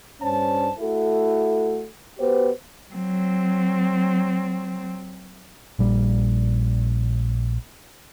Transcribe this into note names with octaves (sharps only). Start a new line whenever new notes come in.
G2 C#4 D4 C5 A5
A3 E4 F#4 A4
B3 F#4 G4 B4 C5
F#3 C4
A#1 G3